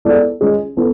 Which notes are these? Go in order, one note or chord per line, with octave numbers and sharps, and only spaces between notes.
G#3 B3 E4 A4 D5
G#3 C#4 G#4
B3 E4 A4